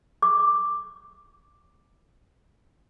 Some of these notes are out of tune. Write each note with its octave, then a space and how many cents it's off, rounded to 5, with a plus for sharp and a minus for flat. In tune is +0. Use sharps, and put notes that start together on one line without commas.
D6 +5